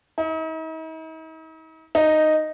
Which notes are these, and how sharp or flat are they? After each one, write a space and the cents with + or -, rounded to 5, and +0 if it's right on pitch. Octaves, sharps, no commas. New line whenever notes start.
D#4 +45
D#4 -5